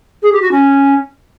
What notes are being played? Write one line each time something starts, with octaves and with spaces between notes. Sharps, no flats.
G#4
G4
F#4
C#4